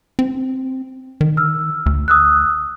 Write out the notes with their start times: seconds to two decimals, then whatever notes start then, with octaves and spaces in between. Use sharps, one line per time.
0.19 C4
1.21 D#3
1.37 E6 F6
1.86 D2
2.08 D#6 E6 F#6